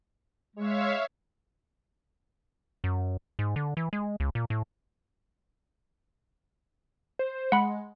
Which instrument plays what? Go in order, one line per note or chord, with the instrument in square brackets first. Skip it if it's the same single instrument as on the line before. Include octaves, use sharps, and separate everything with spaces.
[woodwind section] G#3 [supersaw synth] C#5 E5 F5
[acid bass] F#2
G#2
D3
E3
G#3
C#2
A#2
A2
[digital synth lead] C5
[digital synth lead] G#3 [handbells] F#5 B5